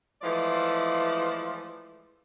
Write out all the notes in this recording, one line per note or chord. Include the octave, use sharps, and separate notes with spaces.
E3 F3 G#3 A3 D5